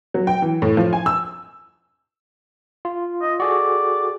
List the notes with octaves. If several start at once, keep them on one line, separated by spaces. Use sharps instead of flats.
F#3
G5
E3
A2
F3
G#5
E6
F4
D#5
F#4 G#4 A4 D5